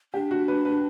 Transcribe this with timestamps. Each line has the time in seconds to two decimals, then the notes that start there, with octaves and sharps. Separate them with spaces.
0.14 D4 G4
0.31 F#4
0.48 B4
0.65 B4